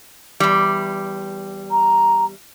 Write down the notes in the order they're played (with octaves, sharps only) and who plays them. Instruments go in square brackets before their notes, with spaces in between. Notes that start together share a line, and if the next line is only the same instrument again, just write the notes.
[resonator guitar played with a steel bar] E2 G3
[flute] A#5